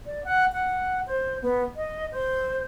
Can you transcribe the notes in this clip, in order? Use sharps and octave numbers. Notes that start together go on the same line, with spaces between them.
D5
F#5
F#5
C5
B3
D#5
C5